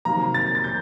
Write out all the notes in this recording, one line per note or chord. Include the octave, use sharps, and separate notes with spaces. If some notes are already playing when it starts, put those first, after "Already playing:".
C3 D#3 F#3 A#3 A#5
A6
A6
G6